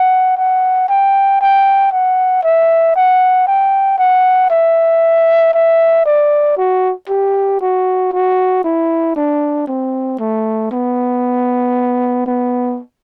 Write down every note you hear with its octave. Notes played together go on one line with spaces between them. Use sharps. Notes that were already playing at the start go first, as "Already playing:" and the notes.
Already playing: F#5
F#5
G5
G5
F#5
E5
F#5
G5
F#5
E5
E5
D5
F#4
G4
F#4
F#4
E4
D4
C4
A3
B3
B3